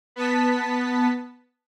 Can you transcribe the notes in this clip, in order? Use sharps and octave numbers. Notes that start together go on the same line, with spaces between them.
B3 A5 B6